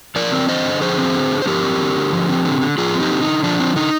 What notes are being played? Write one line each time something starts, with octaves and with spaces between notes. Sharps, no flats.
F3 A#4 D5
C4
D3 C5 D#5
D3
F3 G#4 C5
C4
D3
D3
C5
F3 G4 A#4
C4
D3
D3
F3
C4
D3
D3
F3 F4 G#4
C4
D#4 G4
D3
D#4
D3
F3 D4
C4
D3 D#4